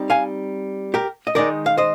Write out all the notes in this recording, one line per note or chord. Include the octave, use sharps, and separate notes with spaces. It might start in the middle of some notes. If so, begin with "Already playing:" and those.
Already playing: G3 C4 D#4
F5 G#5
G4 A#4
D#5
D#3 G#3 D#4 A#4 D5
F5
C5 D#5